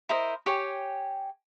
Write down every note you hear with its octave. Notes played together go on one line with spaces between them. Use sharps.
E4 A#4 C5 D#5
G4 C#5 G5 G#5